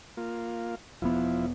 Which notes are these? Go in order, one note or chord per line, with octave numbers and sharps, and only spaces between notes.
A#3 F4
E1 F3 B3 E4